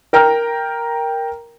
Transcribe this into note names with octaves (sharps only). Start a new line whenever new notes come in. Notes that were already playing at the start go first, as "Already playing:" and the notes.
A#4 G5 A#5 F6